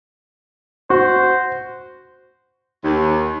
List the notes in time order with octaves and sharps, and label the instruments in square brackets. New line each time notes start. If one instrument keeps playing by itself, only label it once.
[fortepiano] F#4 [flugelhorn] C5
[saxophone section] D#2